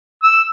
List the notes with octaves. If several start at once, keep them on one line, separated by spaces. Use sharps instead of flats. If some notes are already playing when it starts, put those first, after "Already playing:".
E6